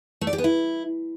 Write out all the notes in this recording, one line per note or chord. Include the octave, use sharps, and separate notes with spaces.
A3
D5
G4
B3
E4